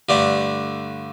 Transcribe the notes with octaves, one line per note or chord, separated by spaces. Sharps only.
G2 D3 A3